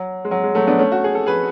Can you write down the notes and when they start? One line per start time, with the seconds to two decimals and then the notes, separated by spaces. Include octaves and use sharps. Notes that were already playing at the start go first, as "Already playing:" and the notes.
Already playing: F#3
0.25 G#3
0.31 F#3
0.43 G#3
0.55 F#3 A3
0.67 B3 D4
0.78 A3 C#4
0.92 F#4
1.04 G#4
1.15 A4
1.26 G#4 B4